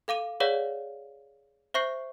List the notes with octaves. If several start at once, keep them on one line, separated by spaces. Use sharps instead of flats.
A4 F5 D6 D#7
G#4 B4 C#5 D5 F5 F#5
C5 E5 C#6 G6 C7